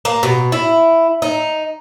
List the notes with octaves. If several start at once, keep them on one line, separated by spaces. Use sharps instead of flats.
A#3
B2
E4
D#4